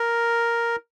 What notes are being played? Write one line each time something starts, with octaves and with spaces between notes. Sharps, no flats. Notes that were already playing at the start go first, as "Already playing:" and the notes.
Already playing: A#4